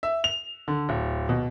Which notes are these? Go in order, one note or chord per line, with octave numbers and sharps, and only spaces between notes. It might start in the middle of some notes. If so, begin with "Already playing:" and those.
E5
F7
D3
D1
B2